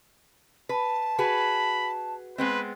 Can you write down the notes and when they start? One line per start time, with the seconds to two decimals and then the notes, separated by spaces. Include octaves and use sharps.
0.69 B4 A5
1.19 F#4 G#4 B4 B5
2.38 G#3 B3 C4 B4